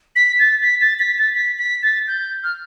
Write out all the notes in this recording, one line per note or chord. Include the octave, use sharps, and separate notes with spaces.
B6
A6
B6
A6
B6
A6
B6
B6
A6
G6
F6